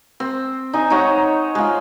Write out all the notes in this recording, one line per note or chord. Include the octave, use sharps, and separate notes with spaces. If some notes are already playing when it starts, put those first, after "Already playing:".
C4
D#4 G#5
D#4 C5 C#5 F#5
G#3 F4